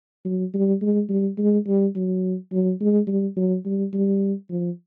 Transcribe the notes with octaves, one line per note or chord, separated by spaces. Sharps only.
F#3
G3
G#3
G3
G#3
G3
F#3
F#3
G#3
G3
F#3
G3
G3
F3